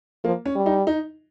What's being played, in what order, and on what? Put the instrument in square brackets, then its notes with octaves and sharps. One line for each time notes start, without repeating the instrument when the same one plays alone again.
[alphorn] F3 [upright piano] A#3
[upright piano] C#4
[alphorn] G3
[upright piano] D#4
D#4